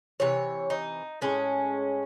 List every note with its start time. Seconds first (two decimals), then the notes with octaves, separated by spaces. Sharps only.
0.20 C3 E3 C#5
0.70 D#4
1.21 A2 G#3 C#4